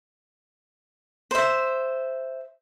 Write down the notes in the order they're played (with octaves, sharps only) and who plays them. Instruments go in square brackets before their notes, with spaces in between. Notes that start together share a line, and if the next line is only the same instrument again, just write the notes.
[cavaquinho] C5 E5